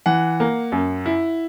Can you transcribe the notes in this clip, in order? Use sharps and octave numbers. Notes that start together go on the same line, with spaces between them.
E3 F#5
A#3
F#2
E4